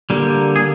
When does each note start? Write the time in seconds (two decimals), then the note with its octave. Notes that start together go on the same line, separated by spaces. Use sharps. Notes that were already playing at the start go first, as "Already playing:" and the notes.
0.10 D3 G3 A#3
0.56 G#4